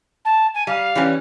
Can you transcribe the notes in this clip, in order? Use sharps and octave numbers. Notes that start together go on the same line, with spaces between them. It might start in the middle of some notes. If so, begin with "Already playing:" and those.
A5
G#5
G3 F5
E3 G3 C#4